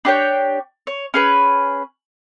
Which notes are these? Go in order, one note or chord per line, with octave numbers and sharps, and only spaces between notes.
D4 G4 C#5 G5
C#5
C#4 G#4 B4